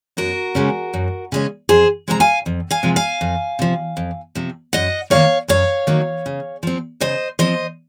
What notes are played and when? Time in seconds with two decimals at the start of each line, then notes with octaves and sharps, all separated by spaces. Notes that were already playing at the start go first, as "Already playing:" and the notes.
0.17 F#2 F#4 A#4
0.55 C#3 G#3 C#4
0.94 F#2
1.32 C#3 G#3 C#4
1.69 F2 G#4 C5
2.08 C3 F3 G#3 C4 A#5
2.20 F5 G#5
2.46 F2
2.71 F5 G#5
2.83 C3 F3 G#3 C4
2.96 F5 G#5
3.21 F2
3.59 C3 F3
3.97 F2
4.35 C3 F3
4.73 F#2 D#5 F#5
5.10 D#3 F#3 A#3 C#5 F5
5.48 F#2 C#5 F5
5.87 D#3 F#3 A#3
6.26 C#3
6.63 F3 C4
7.01 C#3 C5 D#5
7.39 F3 C4 C5 D#5